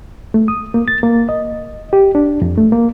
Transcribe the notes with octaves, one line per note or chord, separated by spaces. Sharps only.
A3
D#6
A#3
A6
A#3
D#5
G4
D4
F2
A3
A#3